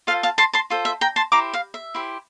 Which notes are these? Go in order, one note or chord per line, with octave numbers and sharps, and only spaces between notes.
F4 A4 C5 F5
F5 A5
A5 C6
A5 C6
F4 A4 C5
E5
G5 A#5
A5 C6
E4 G4 C5 A#5 D6
F5
E5
E4 G4 C5